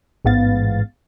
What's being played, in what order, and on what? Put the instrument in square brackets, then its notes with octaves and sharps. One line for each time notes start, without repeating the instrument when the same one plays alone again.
[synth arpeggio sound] A1 G#2 B3 F5 A6